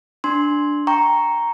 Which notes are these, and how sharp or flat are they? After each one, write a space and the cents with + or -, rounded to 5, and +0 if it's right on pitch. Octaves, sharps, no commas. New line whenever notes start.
D4 +0 C6 +0
G5 +0 A#5 +0 C#6 +0